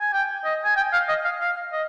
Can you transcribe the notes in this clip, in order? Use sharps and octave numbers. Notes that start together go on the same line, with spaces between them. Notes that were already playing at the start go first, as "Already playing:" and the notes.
G#5
G5
D#5
G#5
G5
F5
D#5
F5
F5
D#5